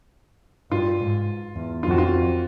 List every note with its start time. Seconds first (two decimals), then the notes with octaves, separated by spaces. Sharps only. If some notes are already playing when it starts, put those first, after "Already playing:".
0.71 G2 F4
1.00 G#2
1.55 E2
1.83 F2 F4
1.91 F#4
1.98 F4